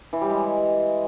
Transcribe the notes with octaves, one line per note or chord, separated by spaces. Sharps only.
E3
G3
G#3